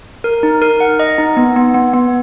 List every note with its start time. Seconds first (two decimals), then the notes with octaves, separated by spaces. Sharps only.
0.24 A#4
0.43 D#4
0.62 A#4
0.80 F#5
0.99 D#5
1.18 D#4
1.37 B3
1.56 B3
1.74 B3
1.94 B3